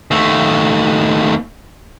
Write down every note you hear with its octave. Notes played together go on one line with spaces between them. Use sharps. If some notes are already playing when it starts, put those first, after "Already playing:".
D#2 A3